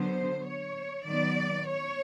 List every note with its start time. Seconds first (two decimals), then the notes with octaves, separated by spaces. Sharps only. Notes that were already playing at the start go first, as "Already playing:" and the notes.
Already playing: D3 F#3 B3 C5
0.46 C#5
1.06 D#3 F#3 B3 D5
1.67 C#5